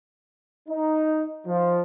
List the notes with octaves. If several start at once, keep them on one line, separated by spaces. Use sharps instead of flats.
D#4
F3